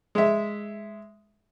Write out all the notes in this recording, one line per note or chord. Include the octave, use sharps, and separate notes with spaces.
G#3 E5